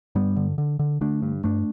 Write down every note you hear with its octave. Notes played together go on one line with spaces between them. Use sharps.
G2 G3 B3
D3
D3
D3
D3 A3 D4
G2
G2 A3 D4